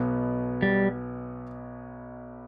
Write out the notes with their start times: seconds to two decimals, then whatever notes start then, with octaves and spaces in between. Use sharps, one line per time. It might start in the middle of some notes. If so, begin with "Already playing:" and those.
Already playing: B1 B2 B3
0.62 G3